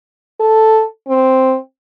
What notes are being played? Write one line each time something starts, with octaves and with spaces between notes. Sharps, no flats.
A4
C4